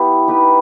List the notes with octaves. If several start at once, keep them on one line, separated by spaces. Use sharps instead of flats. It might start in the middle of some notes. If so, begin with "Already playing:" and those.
Already playing: B3 E4 G4 B4
D#4 G4 B4 E5